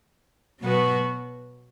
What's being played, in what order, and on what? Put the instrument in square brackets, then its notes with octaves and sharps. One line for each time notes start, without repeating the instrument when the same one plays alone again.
[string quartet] B2 F#3 B3 F#4 B4